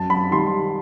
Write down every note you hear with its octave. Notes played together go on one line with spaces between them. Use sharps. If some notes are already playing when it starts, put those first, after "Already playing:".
Already playing: F#2 A5
B5
D#3 G3 C6